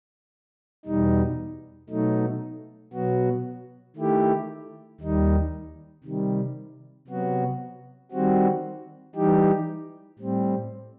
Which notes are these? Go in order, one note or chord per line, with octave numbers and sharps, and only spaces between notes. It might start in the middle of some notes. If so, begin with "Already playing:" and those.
E2 B2 G3 D#4
B2 F#3 A3 D#4
B2 F#3 B3 F#4
D#3 A3 E4 G4
D#2 D#3 G3 D#4
C3 D#3 G3
C3 F#3 B3 F#4
D#3 G3 C4 F#4
E3 G3 D#4 G4
A2 G3 C4